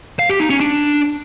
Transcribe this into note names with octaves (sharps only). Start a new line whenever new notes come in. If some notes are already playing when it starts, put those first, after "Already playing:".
F5
G4
D#4
C#4
D4